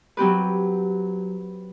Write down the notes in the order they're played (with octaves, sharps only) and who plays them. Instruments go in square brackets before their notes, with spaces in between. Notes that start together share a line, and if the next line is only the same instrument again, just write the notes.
[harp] F#3 C4 G4 B4